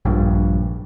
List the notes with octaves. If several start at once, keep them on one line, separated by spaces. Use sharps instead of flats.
A#1 G2